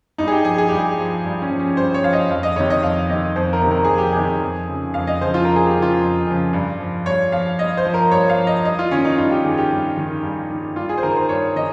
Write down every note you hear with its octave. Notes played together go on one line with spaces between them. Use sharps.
G2 D#4
G#4
G4
F3 G#4
G#4
G2 G4
G#4
F3
G2
C#4
F3
C#4
G2 C5
C#5
F3 F5
D#5
F2 F5
D#5
C3 D#3 C#5
D#5
F2 F5
C3 D#3 D#5
F2 C5
A#4
C3 D#3
A#4
F2 G#4
G4
C3 D#3 G#4
F2
C#3 F3
F2 F5
D#5
C#3 F3 C5
F4
F2 A#4
G#4
G4
C#3 F3
F4
F2
C#3 F3
G2
F3
G2 C#5
F3 F5
G2 D#5
C5
F3
A#4
G2 C#5
F5
F3
D#5
G2 D#5
F4
D#3 C#4
D#4
G2 F4
G4
D#3 G#4
G4
G2
D#3
G2
D#3
G2 F4
G#4
C5
D#3 A#4
C5
G2 C#5
D#3 D#5